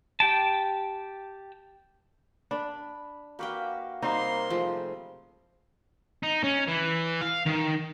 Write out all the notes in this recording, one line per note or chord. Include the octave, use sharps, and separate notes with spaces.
G4 G5 A5
D4 B5
A#3 F#4 G4 B4 F5 G5
C3 G3 A#3 D#4 C6
F3 G#3 A3
D#4
C#4
E3
F5
D#3